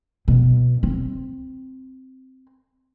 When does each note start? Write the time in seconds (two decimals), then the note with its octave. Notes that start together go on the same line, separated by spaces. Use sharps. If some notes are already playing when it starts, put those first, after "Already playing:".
0.28 B2
0.83 C4